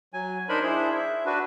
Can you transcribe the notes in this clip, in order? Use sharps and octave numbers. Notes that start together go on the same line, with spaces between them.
F#3 G#5
D4 D#4 A#4 C5 B5
D4 E4 G#4 C5
E5
D4 F#4 B4